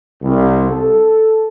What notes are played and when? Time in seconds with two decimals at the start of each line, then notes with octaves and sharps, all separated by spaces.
0.21 C2
0.70 A4